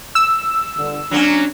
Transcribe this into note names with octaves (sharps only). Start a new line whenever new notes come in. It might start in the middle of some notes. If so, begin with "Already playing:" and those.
E6
G1 D3
F#3 A#3 C#4 D4